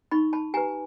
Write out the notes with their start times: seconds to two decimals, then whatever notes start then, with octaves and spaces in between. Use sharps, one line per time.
0.11 D#4 B5 C#6
0.33 A5 B5
0.54 G4 B4 G#5 A#5